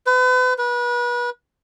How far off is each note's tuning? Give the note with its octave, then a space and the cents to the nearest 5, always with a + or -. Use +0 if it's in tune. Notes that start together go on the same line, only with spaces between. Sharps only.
B4 +40
B4 -30